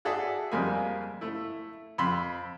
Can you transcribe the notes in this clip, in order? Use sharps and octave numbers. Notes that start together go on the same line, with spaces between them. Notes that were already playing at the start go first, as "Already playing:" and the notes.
F#4 G#4 A4 D5 E5
F2 G3 G#3 A#3 G#5
A3 E4
F2 B5 C6 E6